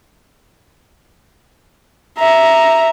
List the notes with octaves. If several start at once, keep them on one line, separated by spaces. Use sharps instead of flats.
E5 A#5